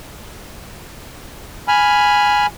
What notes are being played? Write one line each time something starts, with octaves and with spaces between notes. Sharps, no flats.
G#5 B5 F6